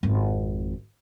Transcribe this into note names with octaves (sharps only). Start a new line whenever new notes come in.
G#1 F2